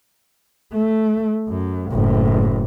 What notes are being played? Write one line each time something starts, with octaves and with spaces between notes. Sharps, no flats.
A3
F#2
F#1 A2